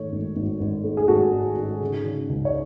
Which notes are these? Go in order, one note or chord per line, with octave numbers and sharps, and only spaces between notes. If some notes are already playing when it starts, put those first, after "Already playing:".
Already playing: G#2 D#3 A3 C#5
G#1
G#1
G#1
A3
G#4
G#1 F#4 A4
G#2
G#2
C#3
C#3
C#2
C#5